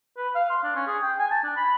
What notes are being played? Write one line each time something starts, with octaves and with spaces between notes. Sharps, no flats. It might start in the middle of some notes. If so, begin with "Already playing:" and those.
B4
F5
C6
D4
C#4
G#4
G5
G#5
A5
D4
B5